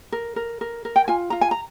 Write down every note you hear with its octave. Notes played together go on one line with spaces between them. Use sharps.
A#4
A#4
A#4
A#4
G5
F4 G#5
F4 A#5
G#5
A#5